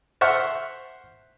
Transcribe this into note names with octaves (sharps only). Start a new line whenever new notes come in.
C5 E5 F#5 C#6 F6